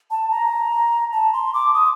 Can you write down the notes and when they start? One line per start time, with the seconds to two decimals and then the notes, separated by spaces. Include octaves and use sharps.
0.11 A5
0.31 A#5
1.12 A5
1.33 C6
1.54 D6
1.74 D#6